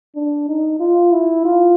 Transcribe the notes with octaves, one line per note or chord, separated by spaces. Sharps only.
D4
D#4
F4
E4
F4